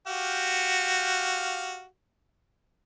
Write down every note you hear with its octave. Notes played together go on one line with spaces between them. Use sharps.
F#4 G4 F5